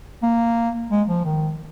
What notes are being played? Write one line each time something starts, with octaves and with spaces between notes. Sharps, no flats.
A#3
G#3
F3
D#3